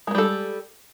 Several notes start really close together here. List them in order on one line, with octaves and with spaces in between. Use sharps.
G#3 A#3 G3 A4